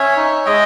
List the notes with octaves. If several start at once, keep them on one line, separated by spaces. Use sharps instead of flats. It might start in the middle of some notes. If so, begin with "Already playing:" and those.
Already playing: C#4 C#5 E5
D#4
G#3 D#5 G5